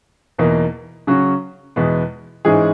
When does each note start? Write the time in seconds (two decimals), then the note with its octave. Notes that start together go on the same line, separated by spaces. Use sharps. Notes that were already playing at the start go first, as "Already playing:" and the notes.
0.38 E2 B2 A#3 D#4
1.07 C#3 F#3 C#4 F#4
1.76 E2 B2 G#3 B3
2.45 G#2 E3 G#3 C#4 G#4